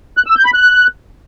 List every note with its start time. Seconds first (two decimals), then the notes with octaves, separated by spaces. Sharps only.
0.17 F#6
0.26 E6
0.36 G6
0.45 B5
0.54 F#6